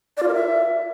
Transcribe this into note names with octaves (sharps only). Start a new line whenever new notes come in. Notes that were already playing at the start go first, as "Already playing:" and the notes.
D5
F4
A#4
E5